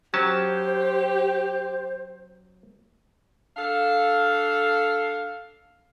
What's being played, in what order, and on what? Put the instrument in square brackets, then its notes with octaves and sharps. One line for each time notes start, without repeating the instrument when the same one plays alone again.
[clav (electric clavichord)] F#3 C#4 A5 [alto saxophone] G4 [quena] C5
[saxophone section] D4 A4 F5